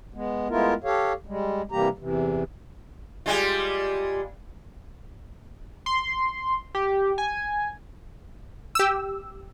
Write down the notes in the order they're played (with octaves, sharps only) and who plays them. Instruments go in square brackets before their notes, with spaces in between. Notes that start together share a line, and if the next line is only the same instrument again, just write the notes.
[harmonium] G#3 B3
G#3 A3 B3 E4 F4 A#4
G4 A4 C#5 F5
G3 G#3
C3 E3 G3 A#3 G4 A#5
E2 C3 E3
[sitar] G3 G#3 F4
[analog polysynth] C6
G4
G#5
[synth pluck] G4 E6